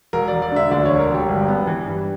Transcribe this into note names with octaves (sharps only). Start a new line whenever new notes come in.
E1 A#4
D5
E1
D5
D3 E5
D2 D5
E1 C#5
A#4
E1 G4
G1
B3
E3
G2